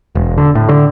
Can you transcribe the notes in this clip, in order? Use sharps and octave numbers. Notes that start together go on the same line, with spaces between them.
E1
D3
A2
D3